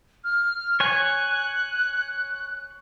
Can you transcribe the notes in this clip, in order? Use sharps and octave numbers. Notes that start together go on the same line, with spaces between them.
F6
C#5 G#5 F#6